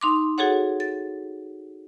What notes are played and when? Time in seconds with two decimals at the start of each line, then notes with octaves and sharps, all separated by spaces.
0.01 D#4 C6 D6
0.38 F#4 G#4 A4 C#5 F#5
0.80 A6